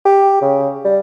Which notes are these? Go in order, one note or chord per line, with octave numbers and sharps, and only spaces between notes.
G4
C#3
G3